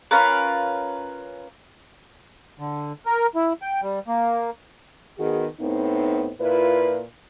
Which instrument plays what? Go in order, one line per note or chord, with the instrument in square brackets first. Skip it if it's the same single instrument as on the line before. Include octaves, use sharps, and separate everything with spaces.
[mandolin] C#4 F4 A#4 B4
[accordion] D3
A#4
E4
G5
G3
A#3
[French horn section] D#3 B3 F#4 G#4
A2 B3 C4 D#4
A#2 E4 F4 B4